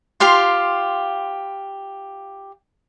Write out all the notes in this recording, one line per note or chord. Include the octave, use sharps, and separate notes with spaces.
F4 G4 F5 C6